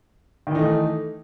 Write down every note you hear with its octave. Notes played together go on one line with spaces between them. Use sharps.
D#3 E3 A3 D#4